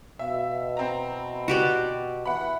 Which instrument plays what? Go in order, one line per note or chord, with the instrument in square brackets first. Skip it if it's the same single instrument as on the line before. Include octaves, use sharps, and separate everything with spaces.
[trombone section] B2 [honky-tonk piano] E5 [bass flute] F5
[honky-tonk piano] C4 A#5 [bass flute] E4
[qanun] F#4 G4 D5
[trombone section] E3 B3 [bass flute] E5 [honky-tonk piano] F#5 B5